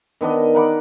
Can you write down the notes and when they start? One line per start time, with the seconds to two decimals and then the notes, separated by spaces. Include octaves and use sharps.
0.21 D#3 B3 D4 D#5
0.55 A#4 F#5 B5 D6